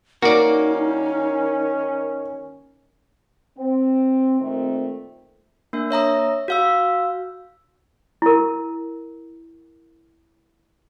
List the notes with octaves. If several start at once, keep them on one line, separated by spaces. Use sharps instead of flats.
D#3 A#3 C#4 D#4 F#4 D5
C4
A#2 D#3 A3 C4
A#3 D4 E5
C#5 E5 A#5 D#6
F#4 F5 E6
E4 A#4